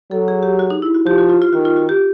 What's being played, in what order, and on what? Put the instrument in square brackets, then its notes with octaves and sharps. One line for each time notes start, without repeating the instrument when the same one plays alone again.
[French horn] F#3 [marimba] A4
[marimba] G#4
G4
F#4
D#4
E4
F#4
[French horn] F3 [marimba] G4
[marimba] F#4
F4
F4
[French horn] D#3 [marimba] F#4
[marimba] F4
F#4
G4